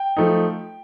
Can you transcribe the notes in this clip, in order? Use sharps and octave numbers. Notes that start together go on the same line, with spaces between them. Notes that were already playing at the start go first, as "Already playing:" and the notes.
Already playing: G5
F3 A3 D#4